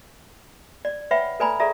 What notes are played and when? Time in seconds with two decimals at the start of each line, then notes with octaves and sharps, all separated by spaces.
0.85 D5
1.11 B4 C#5 E5 F#5 G5 B5
1.40 A4 B4 D5 G#5 A#5 B5
1.60 G#4 A4 D5 E5 A#5